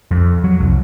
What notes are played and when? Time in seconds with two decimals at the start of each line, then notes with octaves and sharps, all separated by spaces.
0.11 F2
0.44 F#3
0.60 C2